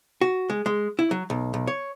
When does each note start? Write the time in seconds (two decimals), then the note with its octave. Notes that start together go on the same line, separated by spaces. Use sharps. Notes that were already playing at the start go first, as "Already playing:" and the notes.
0.21 F#4
0.50 G#3
0.66 G#3
0.99 E4
1.11 F#3
1.30 B1
1.54 B1
1.67 C#5